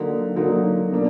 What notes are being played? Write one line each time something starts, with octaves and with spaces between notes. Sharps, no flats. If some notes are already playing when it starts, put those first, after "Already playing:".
Already playing: D3 F#3 A#3 D#4
D3 F#3 A#3 D#4
B2 A#3 D4